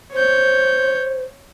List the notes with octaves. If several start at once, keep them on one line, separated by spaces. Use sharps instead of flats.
C5 C#5 G6